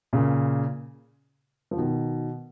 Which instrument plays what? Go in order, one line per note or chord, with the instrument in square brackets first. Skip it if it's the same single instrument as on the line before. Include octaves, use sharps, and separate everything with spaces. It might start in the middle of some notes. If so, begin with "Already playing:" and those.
[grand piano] A#2 C#3
F3
B2 D#3